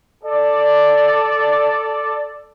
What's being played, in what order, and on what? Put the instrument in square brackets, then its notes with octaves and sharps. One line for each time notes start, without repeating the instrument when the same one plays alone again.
[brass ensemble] A4 D5